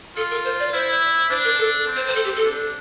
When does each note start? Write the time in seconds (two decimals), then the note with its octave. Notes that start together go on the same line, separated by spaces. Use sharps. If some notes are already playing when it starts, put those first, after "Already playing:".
0.16 F4 A4
0.30 A#4
0.45 C5
0.59 D5
0.73 E4 C5
1.30 D4 C5
1.44 A#4
1.58 A4
1.87 C4
1.96 C5
2.07 C5
2.15 A4
2.25 G4
2.35 A4
2.44 D4